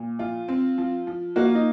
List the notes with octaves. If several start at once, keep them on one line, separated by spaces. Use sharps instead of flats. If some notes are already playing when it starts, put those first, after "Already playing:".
Already playing: A#2
F3 F4
C4
F3
F3
A#3 F#4
F4
D#4